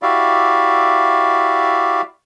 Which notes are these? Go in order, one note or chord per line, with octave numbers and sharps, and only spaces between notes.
E4 F#4 G4 D5 E5 F5